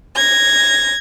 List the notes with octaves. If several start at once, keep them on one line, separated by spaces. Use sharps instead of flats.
G#6 A#6